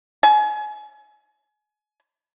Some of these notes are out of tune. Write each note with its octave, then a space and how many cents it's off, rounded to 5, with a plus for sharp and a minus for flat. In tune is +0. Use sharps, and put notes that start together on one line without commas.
G#5 +30